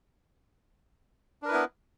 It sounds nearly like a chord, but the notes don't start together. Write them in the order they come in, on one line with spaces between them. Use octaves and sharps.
D4 A#4 B4 E4 B3